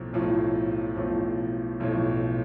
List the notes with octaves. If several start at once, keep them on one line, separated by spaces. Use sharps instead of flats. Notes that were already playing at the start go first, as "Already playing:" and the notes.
Already playing: B1 A2 F3
B1 A2 F3
B1 A2 F3
B1 A2 F3